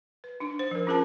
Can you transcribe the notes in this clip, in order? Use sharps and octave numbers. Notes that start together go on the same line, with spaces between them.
B4
D4 D#4
C5
F3 A#4
C#4 F4 G#4 A#4 A5